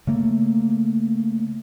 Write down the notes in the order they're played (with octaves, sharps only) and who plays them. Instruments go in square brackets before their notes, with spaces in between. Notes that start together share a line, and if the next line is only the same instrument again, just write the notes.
[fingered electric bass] C#3 A3 A#3